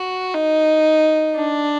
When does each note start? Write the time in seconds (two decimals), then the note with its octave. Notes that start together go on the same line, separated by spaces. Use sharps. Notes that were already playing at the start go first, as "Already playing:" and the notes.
Already playing: F#4
0.34 D#4
1.36 D4